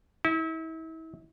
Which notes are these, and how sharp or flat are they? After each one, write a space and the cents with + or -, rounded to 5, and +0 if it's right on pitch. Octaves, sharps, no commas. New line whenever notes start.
E4 -35